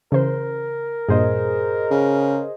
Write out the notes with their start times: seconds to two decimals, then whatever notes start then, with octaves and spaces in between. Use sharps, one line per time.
0.12 C#3 E3 A#4 C5
1.09 G2 A#2 G#4 C5 D#5
1.91 C#3